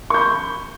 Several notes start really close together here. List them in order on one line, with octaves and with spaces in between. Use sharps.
C#6 G6 B5